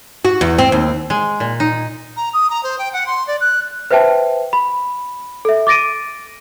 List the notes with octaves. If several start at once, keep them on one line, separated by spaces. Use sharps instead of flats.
F#4
E2
C4
D#2
G#3
A#2
D#4
A#5
D#6
A#5
C5
G5
F#5
C6
D5
F#6
B4 C5 E5 G5 A5
B5
A4 E5
D6 A6 A#6 D7 D#7